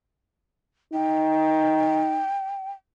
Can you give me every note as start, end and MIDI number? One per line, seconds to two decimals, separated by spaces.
0.94 2.26 63
0.94 2.72 79